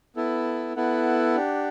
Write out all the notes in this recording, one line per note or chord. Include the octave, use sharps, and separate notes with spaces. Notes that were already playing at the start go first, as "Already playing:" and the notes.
B3 E4 A4
B3 E4 A4 F#5
D4 G4